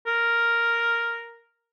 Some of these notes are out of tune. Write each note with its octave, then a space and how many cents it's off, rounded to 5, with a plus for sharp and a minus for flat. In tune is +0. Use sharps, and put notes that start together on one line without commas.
A#4 +0